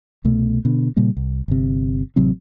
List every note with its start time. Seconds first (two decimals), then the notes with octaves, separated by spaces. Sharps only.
0.24 C2 B2 A3
0.65 B2 D3
0.96 A#2 C#3 G3 A#3
1.17 C2
1.48 G1 C3
2.16 A1 C3 F#3 C4